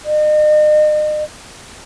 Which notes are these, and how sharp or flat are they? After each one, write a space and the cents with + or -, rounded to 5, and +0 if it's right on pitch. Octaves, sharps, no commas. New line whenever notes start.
D#5 -40